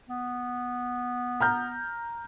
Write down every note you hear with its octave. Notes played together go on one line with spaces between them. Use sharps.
B3
A#5 F6 G6